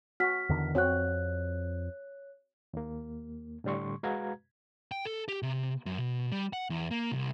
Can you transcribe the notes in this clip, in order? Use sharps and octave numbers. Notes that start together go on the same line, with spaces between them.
F#4 F6 B6
E2 D3 D#3
F2 C4 F#4 C#5 F#6
D#2 A#3
A2 D3 G3 C6 C#6
G#3 F#4 B4 F5 A#5 G#6
G5
A4
G4
C3
F#2
B2
G3
F#5
E2
A#3
C2